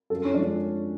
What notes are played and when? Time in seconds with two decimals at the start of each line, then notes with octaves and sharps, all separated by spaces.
0.10 F#2 A4
0.25 C#4
0.34 F3 G#3 D4